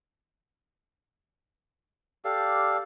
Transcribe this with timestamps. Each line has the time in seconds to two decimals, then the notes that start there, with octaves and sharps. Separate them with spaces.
2.25 G4 A4 D5 F5